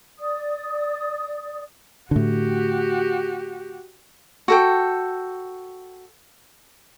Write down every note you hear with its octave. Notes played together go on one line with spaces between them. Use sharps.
D5 D#6
A2 D3 F#4 G4
F#4 A4 G5